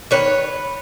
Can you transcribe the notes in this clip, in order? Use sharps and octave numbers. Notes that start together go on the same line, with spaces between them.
D#3 B4 C#5